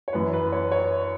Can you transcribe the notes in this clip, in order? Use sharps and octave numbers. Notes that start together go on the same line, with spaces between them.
C#5
F#2 E3 B4
B4
C#5
C#5